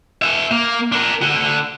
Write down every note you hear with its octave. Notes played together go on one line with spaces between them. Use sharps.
F#4 E5
A#3
D4 A#4
D3 F#4